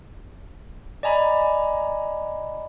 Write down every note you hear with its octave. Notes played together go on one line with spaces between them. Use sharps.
D5 D#5 G#5 A#5 B5